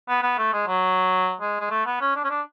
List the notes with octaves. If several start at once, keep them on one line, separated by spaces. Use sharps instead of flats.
B3
B3
A3
G#3
F#3
G#3
G#3
A3
B3
C#4
D4
C#4
D4